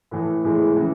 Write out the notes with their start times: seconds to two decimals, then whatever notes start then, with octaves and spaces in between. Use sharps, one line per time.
0.11 A2 E3 A3
0.44 A2 E3 G#3
0.76 C#3 E3